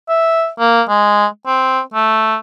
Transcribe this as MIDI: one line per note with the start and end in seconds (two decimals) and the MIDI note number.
0.09 0.48 76
0.59 0.82 58
0.89 1.26 56
1.47 1.80 60
1.94 2.37 57